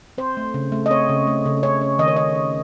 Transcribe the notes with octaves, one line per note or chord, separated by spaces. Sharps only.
C4 C5
A3
C#3
A3
D#5
C4 C#5
C#3
A3
C#3
C#4 C#5
C#4
D#3 D#5
C#5
D#3 D#5
C#4